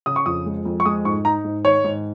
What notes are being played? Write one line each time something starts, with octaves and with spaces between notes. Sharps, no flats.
C#3 D#6
C#6
F2 D#6
G#3
F2
C#6
G#3 D#6
G#2 C#6
D#4 A#5
G#2
D#3 C#5
G#2